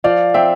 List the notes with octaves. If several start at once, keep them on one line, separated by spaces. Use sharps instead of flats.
F3 D5 F5
C4 E5 G5